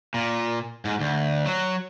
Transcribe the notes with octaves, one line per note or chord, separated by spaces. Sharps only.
A#2
G#2
D2
F#3